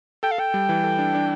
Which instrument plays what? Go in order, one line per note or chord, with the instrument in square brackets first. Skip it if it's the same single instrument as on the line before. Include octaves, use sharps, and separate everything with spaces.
[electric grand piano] A4 [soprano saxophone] G5
[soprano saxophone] F5
[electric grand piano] A4 [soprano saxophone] G5
[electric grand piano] G3
E3
A4
D4
D4